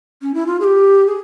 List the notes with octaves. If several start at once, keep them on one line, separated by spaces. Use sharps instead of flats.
C#4
E4
F4
G#4
G4
G#4